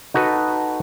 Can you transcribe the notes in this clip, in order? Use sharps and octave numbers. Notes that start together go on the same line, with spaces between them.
D#4 F#4 A4 B4